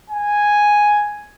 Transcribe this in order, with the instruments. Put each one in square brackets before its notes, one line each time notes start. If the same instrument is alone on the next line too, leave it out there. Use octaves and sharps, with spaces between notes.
[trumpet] G#5